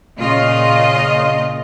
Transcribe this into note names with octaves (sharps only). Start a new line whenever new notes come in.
A#2 C#3 F4 D#5